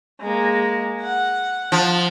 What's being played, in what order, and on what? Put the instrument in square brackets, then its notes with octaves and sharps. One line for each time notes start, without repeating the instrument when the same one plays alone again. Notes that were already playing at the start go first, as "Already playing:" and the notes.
[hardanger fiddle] G#3 A#3
F#5
[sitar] F3